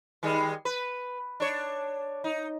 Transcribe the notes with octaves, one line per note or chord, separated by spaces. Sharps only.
D#3 G3 G#3
B4
D4 C#5
D#4